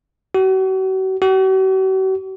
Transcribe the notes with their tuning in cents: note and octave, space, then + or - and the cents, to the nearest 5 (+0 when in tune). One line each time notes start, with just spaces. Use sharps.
F#4 +40
F#4 +45